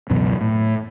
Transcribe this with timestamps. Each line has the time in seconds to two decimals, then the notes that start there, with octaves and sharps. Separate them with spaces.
0.10 C#2 F#2 B2 E3
0.41 A2